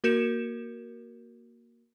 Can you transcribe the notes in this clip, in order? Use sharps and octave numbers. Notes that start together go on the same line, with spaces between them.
A#3 F#4 A#4 G6 C#7 E7